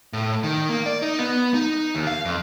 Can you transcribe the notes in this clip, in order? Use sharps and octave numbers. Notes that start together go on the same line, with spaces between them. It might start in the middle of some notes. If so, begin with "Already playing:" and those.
A2
D#3
A#3
D5
D#4
B3
D#4
D#2
F5
F2